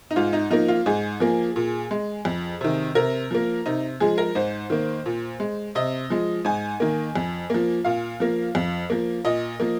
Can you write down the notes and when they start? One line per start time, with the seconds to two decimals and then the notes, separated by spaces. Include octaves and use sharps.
0.11 D#4
0.16 G#2 F4
0.33 D#4
0.50 F3 A#3 D#4
0.68 F4
0.86 G#2 G#4
1.20 F3 A#3
1.56 A#2
1.91 G#3
2.25 F2
2.61 C3 D#3
2.95 C3 A#4
3.31 F3 A#3
3.66 C3 D#4
4.00 F3 G#3 G#4
4.18 A#4
4.35 G#2 C5
4.70 D#3 A#3
5.06 A#2
5.40 G#3
5.75 C3 D#5
6.10 F3 G#3
6.45 G#2 G#5
6.80 D#3 A#3
7.16 F2
7.50 F3 A#3
7.85 A#2 F5
8.20 F3 A#3
8.55 F2
8.90 F3 A#3
9.25 A#2 D#5
9.60 F3 A#3